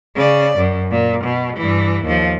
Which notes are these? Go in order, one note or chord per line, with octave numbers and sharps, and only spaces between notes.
C#3 D5
F#2
A#2
B2
G2 E3
D#2 F3